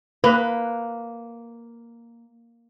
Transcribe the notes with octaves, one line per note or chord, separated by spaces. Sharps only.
A#3 B4